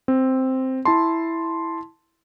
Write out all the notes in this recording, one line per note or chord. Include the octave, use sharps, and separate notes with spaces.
C4
E4 A5 C6